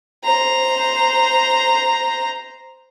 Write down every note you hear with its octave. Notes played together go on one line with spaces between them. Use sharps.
C5 A#5